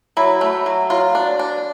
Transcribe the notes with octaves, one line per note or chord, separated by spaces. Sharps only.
F#3 E4
A3
F#3
F#3 F4
D4
D4